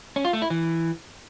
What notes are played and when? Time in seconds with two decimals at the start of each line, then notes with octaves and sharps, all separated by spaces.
0.16 C#4
0.25 F4
0.33 A3
0.42 E4
0.50 E3